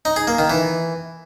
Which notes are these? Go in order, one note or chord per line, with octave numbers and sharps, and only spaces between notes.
D#4
G#4
A#3
D#3
E3